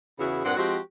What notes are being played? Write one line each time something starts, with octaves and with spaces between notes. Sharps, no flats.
E2 C#3 B3 E4 F#4
G2 A#2 C4 F#5
F3 G#3 C4 F#4 G4